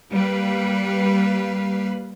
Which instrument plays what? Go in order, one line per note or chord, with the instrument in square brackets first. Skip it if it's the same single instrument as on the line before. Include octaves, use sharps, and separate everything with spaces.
[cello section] G3 A#3 B4 F5